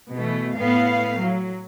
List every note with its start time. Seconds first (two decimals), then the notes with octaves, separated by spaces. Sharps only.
0.13 B2 E3 A3
0.57 A2 B3 F5
1.20 F#3